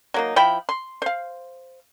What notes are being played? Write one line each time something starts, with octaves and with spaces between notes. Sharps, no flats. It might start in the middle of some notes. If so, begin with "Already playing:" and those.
F#3 A#3 D#4
F3 E4 G5 B5
C6
C5 F5